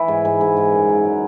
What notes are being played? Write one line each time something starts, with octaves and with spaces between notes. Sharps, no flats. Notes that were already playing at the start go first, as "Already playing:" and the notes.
Already playing: E3 E4
G#2
G#2
G#2
G#2
F#2
F#3
F#3